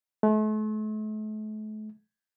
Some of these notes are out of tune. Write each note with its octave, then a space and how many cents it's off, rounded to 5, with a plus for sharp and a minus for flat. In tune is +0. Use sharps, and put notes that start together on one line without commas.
A3 -40